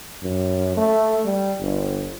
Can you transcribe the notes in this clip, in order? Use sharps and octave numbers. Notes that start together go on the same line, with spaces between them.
F#2
A3
G3
G1